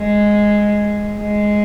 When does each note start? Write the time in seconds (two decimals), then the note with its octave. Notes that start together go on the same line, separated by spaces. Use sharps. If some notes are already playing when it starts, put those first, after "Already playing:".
Already playing: G#3
1.19 G#3